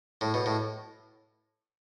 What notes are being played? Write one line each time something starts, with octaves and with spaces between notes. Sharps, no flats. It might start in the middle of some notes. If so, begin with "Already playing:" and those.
A2
B2
A2